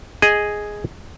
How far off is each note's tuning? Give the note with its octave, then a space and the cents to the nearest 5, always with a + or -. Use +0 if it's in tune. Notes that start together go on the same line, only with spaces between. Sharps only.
G#4 +0 D#5 +0